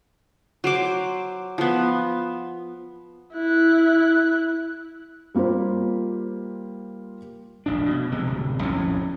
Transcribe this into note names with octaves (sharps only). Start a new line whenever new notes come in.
F#3 C5 D6
F3 B3
E4 F#6
G3 A#3 F4 G4 C5
F1 A#1 A2 D4
B2
C3 F3 G#3
D1 C3
A#1 F2 A2 C#4